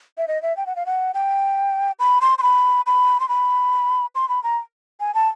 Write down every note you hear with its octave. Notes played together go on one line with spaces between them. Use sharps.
E5
D#5
E5
G5
F#5
F5
F#5
G5
B5
C6
C6
B5
B5
C6
B5
C6
B5
A#5
G#5
A5